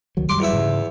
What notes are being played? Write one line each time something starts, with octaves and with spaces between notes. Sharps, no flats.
C#2 D#3 F#3
F#2 F#3 G3 C6 D6
E2 E5
G#2 C#3